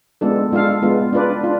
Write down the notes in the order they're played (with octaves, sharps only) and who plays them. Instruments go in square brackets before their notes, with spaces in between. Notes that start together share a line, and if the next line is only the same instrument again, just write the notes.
[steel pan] G#3 B3 D4 F4 A4
G#3 D4 F4 A4 F5
G#3 B3 F4
D4 F4 B4 D5
D4 F4